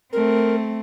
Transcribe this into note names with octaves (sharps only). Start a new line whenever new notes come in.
A3 C4 A#4